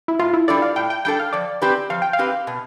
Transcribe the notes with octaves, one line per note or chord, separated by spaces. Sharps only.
E4
A2 F4
E4
G3 D4 A4 D5
F5
A2 G5
G5
G3 D4 A4 G5
F5
F3 D5
C4 G4 B4
F3 F5
G5
F5
C4 G4 B4
B2